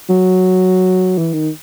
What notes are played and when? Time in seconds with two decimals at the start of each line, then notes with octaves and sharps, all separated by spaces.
0.09 F#3
1.18 E3
1.33 D#3